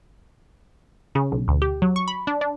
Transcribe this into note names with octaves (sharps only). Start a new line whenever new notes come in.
C#3
B1
D2
G4
F#3
C#6
B5
D4
D4